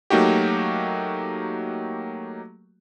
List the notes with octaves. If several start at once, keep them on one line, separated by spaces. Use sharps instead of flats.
F#3 A3 A#3 D#4 F#4 G4